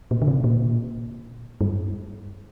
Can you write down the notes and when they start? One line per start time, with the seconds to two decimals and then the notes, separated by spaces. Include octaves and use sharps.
0.11 A#2
0.22 D3
0.28 C3
0.44 A#2
1.61 G2